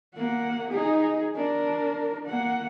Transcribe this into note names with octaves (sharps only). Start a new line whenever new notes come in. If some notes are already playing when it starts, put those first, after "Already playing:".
A#3 F#5
D#4 G#4
D4 A#4
A#3 F#5